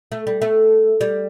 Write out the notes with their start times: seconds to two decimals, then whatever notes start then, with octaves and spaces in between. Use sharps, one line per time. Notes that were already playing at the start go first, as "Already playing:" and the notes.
0.12 A3
0.27 G3
0.42 A3
1.01 G3